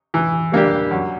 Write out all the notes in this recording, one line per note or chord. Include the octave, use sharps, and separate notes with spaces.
E3
G3 A#3 D4 G4
F#2